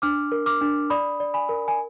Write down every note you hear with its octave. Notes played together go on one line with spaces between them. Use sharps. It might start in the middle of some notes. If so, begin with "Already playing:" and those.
D4 D6 F6
A#4
D6 F6
D4
D5 B5 D#6
D5
G#5 B5
A#4
G#5